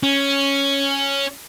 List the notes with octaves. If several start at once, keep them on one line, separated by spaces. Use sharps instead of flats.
C#4